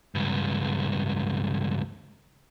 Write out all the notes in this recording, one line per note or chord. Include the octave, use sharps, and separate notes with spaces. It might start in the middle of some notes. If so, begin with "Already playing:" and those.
C#2 G2